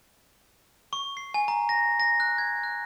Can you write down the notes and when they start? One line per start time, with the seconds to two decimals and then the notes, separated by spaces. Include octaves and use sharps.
0.93 C#6
1.17 C7
1.34 G#5
1.48 A#5
1.69 A#6
2.00 A#6
2.20 F#6
2.38 G#6
2.63 F#6